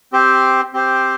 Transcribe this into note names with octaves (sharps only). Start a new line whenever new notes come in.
C4 G4 C5
C4 G4 C5